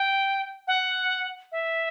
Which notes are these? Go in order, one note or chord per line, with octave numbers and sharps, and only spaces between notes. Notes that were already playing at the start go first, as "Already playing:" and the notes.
Already playing: G5
F#5
E5